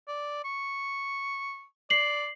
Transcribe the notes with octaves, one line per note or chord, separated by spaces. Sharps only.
D5
C#6
D5 C7 F#7